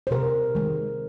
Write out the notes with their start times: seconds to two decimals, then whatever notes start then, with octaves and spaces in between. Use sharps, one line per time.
0.07 C5
0.11 C3 A#4
0.55 D#3 G#3